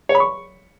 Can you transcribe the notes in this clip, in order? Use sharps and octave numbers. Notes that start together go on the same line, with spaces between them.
C#5
B5
C#6